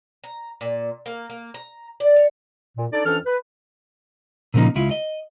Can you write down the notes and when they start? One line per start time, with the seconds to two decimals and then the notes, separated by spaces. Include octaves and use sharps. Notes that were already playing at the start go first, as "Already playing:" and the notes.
0.24 A#5
0.61 A#2
1.06 A#3
1.30 A#3
1.54 A#5
2.00 D5
2.16 C#5
2.77 A#2
2.92 D4 D#4 A4 D5
3.05 F2 E3 C#4 D4 A4 F6
3.26 B4
4.54 A#2 C#3 F3 A#3 D#4
4.75 C#2 E4 F4
4.91 D#5